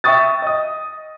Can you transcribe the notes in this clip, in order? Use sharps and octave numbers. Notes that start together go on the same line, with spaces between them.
E5 G5 C#6 D#6 A6
D#5 D#6